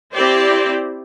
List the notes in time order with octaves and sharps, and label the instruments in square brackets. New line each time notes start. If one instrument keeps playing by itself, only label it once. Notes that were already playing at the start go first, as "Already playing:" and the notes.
[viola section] C4 E4 G4 C5 D5